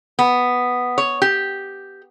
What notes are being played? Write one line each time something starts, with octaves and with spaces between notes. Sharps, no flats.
B3
C#5
G4